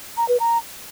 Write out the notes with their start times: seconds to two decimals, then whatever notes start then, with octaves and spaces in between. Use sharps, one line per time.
0.17 A#5
0.29 B4
0.40 A#5